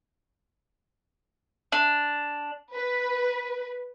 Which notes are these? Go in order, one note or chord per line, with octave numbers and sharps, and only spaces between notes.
D4
B4